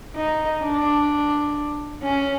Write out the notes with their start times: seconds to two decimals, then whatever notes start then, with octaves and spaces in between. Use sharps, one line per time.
0.17 D#4
0.64 D4
2.03 C#4